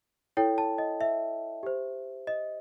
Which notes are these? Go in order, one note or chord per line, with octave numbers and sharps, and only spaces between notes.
E4 A4 C#5 G5
A5
D#5
E5
G4 C5
D#5